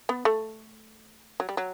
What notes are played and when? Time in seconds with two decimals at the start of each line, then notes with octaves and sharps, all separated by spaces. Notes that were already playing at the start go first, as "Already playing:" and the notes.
0.09 B3
0.25 A3
1.40 F#3
1.49 G3
1.57 F#3